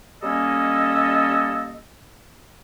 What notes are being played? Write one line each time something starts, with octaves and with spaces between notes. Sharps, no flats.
G3 A#3 C#4 A4 D#5